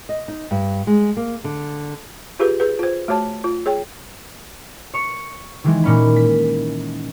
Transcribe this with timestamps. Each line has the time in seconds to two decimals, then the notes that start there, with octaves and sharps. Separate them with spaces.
0.09 D#5
0.28 D#4
0.51 G2
0.87 G#3
1.17 A#3
1.44 D3
2.39 F4 G4 G#4 B4
2.60 G#4 B4
2.79 F4 C5
3.08 A3 F#4 C#5 A5
3.44 F4
3.66 G#4 C#5 G5
4.94 C#5 C#6
5.64 D#3 E3 G#3
5.84 A#2 C#4 B5
6.16 B6